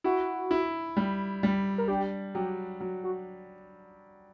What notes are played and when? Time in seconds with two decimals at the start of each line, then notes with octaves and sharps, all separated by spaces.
0.04 E4 F#4
0.51 E4
0.97 G3
1.43 G3
1.78 A#4
1.88 D4 G4
2.35 F#3 G4
2.80 F#3
3.04 F#4